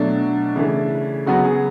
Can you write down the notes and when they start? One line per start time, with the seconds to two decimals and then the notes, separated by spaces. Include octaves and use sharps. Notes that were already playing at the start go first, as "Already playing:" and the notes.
Already playing: B2 F#3 A3 D4
0.56 C#3 E3 A3
1.26 C#3 F#3 B3 F#4
1.44 G#4